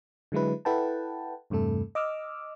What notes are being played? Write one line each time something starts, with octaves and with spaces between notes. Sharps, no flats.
D3 F#3 G#3 E4 B4
E4 A4 B4 F#5 G5 A5
E2 G2 C3 A3 A4
D#5 D6 E6 F6